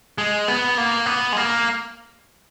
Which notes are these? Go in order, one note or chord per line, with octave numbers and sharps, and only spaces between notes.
G#3
B3
A#3
B3
G#3
A#3